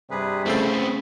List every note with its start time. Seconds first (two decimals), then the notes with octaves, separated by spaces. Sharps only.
0.11 G2 C3 G3 G#4 B4
0.46 A2 C#3 B3 C4 A4 B5